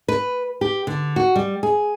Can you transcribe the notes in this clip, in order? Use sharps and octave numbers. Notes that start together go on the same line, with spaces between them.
B4
G4
D3
F#4
G3
G#4